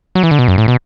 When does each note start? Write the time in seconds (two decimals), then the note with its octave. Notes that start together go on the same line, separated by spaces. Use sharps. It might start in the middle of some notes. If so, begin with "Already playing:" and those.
0.15 F#3
0.23 E3
0.31 D3
0.39 B2
0.48 F#2
0.58 A2
0.68 B2